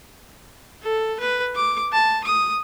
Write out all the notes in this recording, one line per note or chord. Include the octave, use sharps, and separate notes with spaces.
A4
B4
D6
A5
D#6